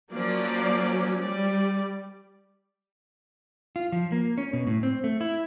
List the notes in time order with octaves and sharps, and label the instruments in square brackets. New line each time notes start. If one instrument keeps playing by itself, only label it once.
[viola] F3 C#4 [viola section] F#3 A#3 D5
[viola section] G3 [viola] D5
[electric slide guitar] F4
F3
A#3
C#4
B2
A2
C4
A3
E4